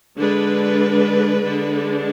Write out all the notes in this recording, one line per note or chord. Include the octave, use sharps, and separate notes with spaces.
D3 G#3 D4 B4
D3 G#3 D4